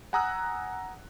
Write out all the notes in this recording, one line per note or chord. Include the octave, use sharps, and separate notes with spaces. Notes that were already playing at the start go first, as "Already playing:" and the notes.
F#5 G#5 A#5 D#6 E6 F#6